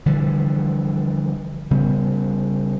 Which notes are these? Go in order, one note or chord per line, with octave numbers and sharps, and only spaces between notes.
D3 E3 F3 G3
C#3 G3 B3